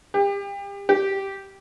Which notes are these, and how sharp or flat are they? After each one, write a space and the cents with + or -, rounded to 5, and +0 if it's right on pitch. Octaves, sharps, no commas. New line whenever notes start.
G4 +35
G4 -5